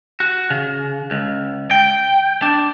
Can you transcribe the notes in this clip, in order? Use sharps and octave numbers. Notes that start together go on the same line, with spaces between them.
F#4
C#3
C#2
G5
D4